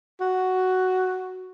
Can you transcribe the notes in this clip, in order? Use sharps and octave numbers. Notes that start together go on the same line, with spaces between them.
F#4